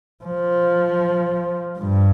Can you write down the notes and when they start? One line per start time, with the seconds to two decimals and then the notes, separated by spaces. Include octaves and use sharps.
0.24 F3
1.79 G2